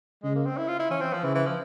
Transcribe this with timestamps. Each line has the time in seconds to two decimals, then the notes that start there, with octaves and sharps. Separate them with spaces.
0.23 C#3 G#3
0.35 A#3
0.46 C4
0.57 E4
0.68 F4
0.79 E4
0.90 E3 C#4
1.01 C4
1.13 F3
1.23 C#3 E3
1.35 E3
1.46 F3